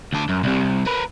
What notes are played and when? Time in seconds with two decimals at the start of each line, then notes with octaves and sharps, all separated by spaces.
0.13 D2 D4
0.29 F#2
0.44 C2 C3
0.87 A#4 B4